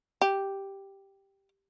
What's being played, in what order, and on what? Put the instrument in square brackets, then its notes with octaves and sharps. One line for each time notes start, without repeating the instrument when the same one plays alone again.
[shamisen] G4